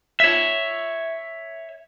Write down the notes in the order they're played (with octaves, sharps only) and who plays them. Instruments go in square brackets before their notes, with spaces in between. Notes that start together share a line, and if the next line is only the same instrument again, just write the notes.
[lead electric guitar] C#5 E5